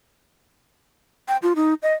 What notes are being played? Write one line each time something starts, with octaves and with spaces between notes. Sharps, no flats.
G5
F4
D#4
D#5